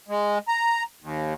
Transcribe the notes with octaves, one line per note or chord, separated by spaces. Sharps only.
G#3
A#5
D#2